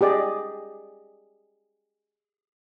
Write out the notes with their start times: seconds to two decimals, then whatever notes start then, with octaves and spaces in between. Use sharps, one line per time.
0.01 G4 G#4 D5 D#5